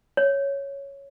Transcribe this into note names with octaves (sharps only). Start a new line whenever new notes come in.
C#5